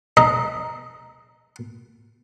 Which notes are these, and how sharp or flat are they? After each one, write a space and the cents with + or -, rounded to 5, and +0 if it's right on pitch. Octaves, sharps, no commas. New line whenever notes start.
D#5 +0 A#5 +0